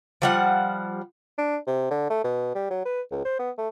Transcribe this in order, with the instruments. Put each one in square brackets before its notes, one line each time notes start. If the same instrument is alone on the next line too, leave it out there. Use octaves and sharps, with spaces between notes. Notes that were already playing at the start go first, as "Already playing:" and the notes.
[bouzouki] F3 G3 F#5
[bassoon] D4
C3
D3
A3
B2
G3
F#3
B4
C#2
C5
B3
A3